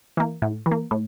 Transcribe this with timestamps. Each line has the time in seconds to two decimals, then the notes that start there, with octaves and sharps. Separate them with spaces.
0.17 E3 A#3
0.42 A2
0.66 E3
0.71 A#3
0.91 A2